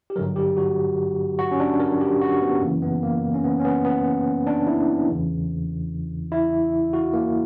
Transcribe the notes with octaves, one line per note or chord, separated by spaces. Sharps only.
G4
G2 D3 F#3 A#4
G4
F#4
F#4
C#4
D4
A#4
G4
F#4
B3
F#2 C#3 E3 A#3
B3
A#3
C#4
B3
C#4
B3
B3
D4
E4
E2 C#3 E3
E4
F#4
A#3